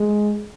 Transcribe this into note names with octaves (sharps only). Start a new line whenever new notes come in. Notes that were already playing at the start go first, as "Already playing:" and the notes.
Already playing: G#3